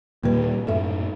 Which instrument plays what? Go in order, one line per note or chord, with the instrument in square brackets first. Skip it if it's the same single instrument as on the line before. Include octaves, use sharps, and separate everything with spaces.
[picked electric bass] D#2 A#2 G3 [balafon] A#3 B4
[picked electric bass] F#2 A2 [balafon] A4 E5